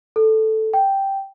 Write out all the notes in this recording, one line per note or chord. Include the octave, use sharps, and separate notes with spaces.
A4
G5